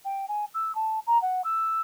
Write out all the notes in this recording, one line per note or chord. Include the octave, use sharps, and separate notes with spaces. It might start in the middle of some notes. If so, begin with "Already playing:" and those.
G5
G#5
E6
A5
A#5
F#5
E6